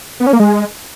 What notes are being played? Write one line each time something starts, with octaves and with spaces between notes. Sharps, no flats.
B3
C#4
A#3
G#3